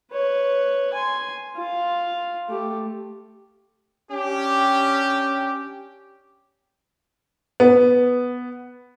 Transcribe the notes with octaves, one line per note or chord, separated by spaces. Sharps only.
B4 C#5
G#5 C6
F4 F5
A3 G4
C#4 D4 G4
B3